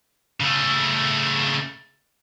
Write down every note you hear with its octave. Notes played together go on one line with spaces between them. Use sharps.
C#3 A3